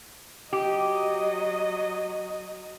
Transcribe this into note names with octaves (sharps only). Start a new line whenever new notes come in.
F#3 G4 D#5